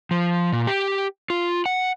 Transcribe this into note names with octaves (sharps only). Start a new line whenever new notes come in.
F3
A#2
G4
F4
F#5